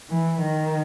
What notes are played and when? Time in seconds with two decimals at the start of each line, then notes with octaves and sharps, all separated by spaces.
0.10 E3
0.41 D#3